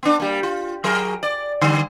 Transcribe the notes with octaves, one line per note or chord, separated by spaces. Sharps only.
B3 D4
G3 A#3
F4
F#3 G#4 A#4
D5
D3 G3